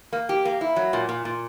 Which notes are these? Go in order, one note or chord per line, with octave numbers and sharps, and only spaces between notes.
A#3
G4
A#3
E4
F#3
A#2
A#2
A#2